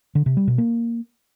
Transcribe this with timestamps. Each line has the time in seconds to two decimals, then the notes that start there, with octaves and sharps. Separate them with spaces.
0.15 D3
0.26 C3
0.37 G3
0.47 B2
0.58 A#3